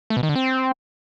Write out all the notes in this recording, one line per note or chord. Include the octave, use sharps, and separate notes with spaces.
A3
B2
D#3
D3
C4